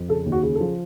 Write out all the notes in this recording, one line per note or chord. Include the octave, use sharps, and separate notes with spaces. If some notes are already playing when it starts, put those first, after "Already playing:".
Already playing: F2
C#3 A4
D#2
F#4
C#3
A4
F3